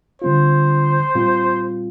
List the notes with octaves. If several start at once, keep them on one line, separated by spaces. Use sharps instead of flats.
D3 G3 C4 F4 C5
A#2 G3 C4 F4